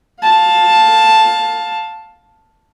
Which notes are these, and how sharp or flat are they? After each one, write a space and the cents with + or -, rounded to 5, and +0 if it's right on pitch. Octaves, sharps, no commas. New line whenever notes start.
F5 +15 A5 +0